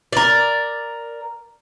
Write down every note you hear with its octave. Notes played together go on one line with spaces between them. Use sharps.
A#4 D5